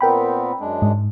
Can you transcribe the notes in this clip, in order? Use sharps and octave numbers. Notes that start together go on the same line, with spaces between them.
A#2 B3 C4 A#4 G5 B5
F#2 G#3 D4
G#2